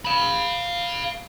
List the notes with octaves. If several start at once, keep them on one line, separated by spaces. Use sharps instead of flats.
F5 B5